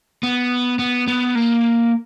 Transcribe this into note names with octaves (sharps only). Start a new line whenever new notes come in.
B3
B3
B3
A#3